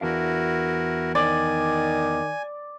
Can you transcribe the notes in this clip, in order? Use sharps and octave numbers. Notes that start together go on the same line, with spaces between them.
E2 D4 E4 F#4 A#4 F5
D#3 D5 G#5